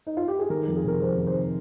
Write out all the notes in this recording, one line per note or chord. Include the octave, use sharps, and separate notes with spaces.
D#4
F4
G4
G#4
D#3 A#4
A#4
F2
G#4
C3 A#4
F2 C5
D#3
C5